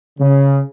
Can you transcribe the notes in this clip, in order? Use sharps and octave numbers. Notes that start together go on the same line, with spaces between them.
C#3